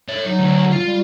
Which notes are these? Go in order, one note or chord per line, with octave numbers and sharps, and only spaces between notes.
C#5 E5
F#3 D#4
D2
F4
G3